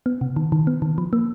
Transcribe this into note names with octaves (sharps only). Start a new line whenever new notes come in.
B3
C3
D#3
D#3
B3
D#3
F3
A#3